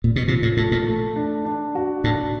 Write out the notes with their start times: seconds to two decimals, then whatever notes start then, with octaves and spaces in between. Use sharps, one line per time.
0.04 A#2
0.16 B2
0.27 C3 F3
0.42 A2
0.57 A2 A3
0.72 A#2
0.86 A3
1.16 D4
1.45 D4
1.75 F#4
2.04 A2 D4